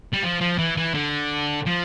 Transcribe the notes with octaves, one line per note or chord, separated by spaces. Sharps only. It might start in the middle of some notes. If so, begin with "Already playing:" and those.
G3
F3
F3
E3
E3
D3
F3